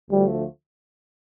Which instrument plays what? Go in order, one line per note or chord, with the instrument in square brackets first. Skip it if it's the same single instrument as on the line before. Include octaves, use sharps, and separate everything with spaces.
[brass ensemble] D2 D3 F3 A3 [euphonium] G3